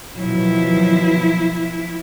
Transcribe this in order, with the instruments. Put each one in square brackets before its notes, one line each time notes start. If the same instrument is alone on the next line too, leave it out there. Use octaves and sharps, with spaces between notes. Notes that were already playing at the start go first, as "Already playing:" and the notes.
[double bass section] B2 D#3 F#3 [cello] F3 E4